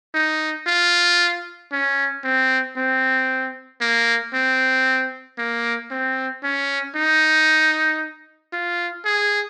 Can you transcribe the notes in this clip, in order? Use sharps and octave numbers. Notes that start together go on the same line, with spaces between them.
D#4
F4
C#4
C4
C4
A#3
C4
A#3
C4
C#4
D#4
F4
G#4